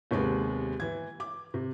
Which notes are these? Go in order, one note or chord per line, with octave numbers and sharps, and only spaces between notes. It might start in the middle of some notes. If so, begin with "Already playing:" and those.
D#2 C3 G#3 B3
E3 G#6
D6
C3